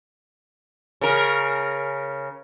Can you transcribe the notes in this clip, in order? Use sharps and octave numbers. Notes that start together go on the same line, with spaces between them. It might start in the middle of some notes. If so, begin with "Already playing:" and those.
C#3 A#4